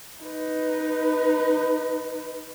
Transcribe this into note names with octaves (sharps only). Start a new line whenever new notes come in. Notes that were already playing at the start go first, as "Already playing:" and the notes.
D#4 B4